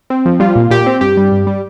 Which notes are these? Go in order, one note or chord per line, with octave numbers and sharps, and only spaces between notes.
C4
F3
G3 F4
A#2
A#2 G4
C4
G2 G4
G3
G2
G3